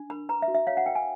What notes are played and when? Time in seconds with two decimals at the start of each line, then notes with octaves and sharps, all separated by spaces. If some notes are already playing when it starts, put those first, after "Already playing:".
Already playing: D4
0.10 A#4 B5
0.29 B4 A#5
0.42 E5
0.48 F#4
0.54 E5
0.67 C#5 F5
0.77 F#5
0.86 A#4 G5
0.95 G#5